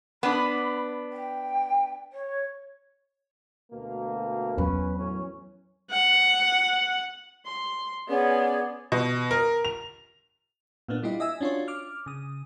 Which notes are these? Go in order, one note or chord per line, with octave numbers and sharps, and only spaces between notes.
B3 D4 B5
G5
C#5
D2 B2 A#3
E2 F#3 C#4 B4
F#2 A2 C#4
F#5
C6
B3 C#4 G#4 D5
B2
A#4
F7
A#2 A#3 B3 D4
G3 E4 F4 G4 D#5
D#5 E5 G#5 E6
C#4 D4 F4 F#4 C#5
D6 F6
C#3 D#6